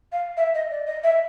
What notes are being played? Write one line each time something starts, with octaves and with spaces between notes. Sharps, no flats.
F5
E5
D#5
D5
D#5
E5